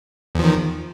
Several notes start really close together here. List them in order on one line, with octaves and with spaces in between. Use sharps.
E2 F3 D#3